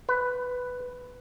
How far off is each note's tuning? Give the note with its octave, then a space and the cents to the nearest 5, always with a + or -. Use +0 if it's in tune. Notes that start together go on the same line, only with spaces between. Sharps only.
B4 +5